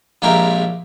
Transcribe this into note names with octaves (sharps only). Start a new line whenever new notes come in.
A#1 A#2 G#3 E4 G4 A#4